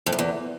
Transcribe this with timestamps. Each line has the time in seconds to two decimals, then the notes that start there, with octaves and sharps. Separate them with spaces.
0.06 F2
0.13 F#2
0.19 E2